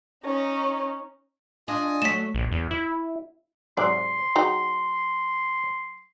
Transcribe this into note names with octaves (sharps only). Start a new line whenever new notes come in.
C#4 D#4
D4 F4 D#5 G#5
F#3 A3 B6 E7
A#1
E2
E4
G#2 C3 F#3 D5 C6
F#3 D#4 G#4 G5 A#5